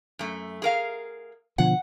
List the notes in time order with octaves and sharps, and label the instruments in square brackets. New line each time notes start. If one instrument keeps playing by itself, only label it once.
[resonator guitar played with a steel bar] F#2 A3
G#4 A#4 F5
[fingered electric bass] B2 D3 F3 [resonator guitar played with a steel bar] F#5